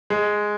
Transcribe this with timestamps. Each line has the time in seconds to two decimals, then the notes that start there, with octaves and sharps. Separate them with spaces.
0.10 G#3